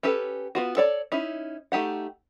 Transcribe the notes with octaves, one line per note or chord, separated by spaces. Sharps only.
C#4 G4 A4 B4
B3 F4 F#4
A4 C#5 D5
C#4 D#4 E4
A3 D#4 G4 F#5